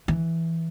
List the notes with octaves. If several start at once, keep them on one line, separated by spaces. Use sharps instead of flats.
E3